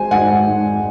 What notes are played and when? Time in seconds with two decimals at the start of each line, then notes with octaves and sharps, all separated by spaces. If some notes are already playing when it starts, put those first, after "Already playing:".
Already playing: G#3 C5 G#5
0.11 G#2 F#5 G#5
0.47 G#2